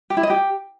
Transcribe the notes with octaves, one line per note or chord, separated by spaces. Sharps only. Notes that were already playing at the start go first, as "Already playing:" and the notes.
G4
E4
D#5
G4